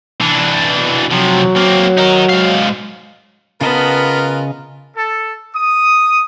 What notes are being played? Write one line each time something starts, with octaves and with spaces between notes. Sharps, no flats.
E3 D4
B2
C3 F3 F#3
A#3 C4
D#4 A#4
G#2 F5
C#3 B3 F4 A#4 B4 D#5 A5
A4
D#6